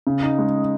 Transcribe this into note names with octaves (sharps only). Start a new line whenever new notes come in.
C#3
D#4
G#3